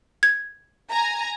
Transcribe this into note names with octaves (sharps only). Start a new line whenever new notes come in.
G#6
G#5 A#5